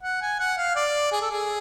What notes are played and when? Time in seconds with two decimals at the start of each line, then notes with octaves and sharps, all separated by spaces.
0.03 F#5
0.22 G#5
0.40 F#5
0.57 F5
0.76 D5
1.12 G#4
1.22 A4
1.31 G#4